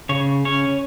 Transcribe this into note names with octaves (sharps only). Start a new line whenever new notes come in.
C#3 C#5
C#4 C#5